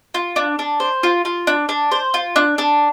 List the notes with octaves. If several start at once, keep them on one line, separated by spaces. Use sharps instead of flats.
F4
D4
D4
C5
F4
F4
D4
D4
C5
F4
D4
D4